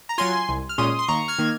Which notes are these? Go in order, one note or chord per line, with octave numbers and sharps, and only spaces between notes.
A#5
F#3 C#4 F4 G#5 C6
C2
F6
A#2 G#3 C#4 C6 D#6
C6
D#2 A#5 C#6
F6 G#6
D#3 A#3